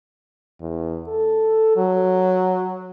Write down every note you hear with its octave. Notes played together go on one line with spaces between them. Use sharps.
E2
A4
F#3